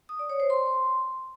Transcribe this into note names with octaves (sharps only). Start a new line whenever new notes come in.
D#6
D5
C#5
C5
C6